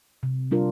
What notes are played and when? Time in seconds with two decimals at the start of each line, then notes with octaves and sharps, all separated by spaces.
0.23 C3
0.51 G3 D4 F4 A#4